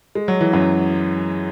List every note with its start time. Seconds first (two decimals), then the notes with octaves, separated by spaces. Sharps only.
0.15 G#3
0.28 F#3
0.41 E3
0.53 F#2 F#3